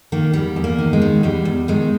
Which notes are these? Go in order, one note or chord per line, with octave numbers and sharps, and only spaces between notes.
D#3 A#3
E2 G3
E2
A#3
D#3
G#3
D#3
E2 G3
E2
D#3 G#3